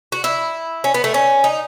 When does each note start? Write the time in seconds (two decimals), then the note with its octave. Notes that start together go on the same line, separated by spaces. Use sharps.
0.12 F#4
0.24 E4
0.84 C#4
0.94 B3
1.04 A3
1.14 C#4
1.44 D#4